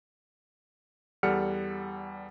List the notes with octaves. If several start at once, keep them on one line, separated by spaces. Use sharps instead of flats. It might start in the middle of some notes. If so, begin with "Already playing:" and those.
E2 G3 A4 F#5 F6 C#7